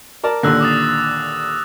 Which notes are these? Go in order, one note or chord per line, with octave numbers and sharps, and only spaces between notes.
A#4 D5 A5
D#2 A#2 D3 E6 F#6 A#6
D6 D#6 A6